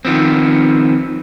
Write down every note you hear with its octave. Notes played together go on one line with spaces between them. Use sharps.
D#3 F3 B3 C4